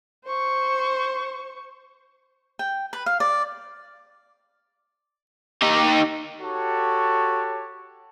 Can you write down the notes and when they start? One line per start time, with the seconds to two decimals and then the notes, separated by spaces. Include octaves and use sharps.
0.25 C5 C#6
2.59 G5
2.93 B4
3.06 F5
3.20 D5
5.62 D#4 G4
6.41 F#4 G4 A4 C#5 A5